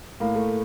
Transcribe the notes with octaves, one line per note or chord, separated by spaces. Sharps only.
A2 A#3
A3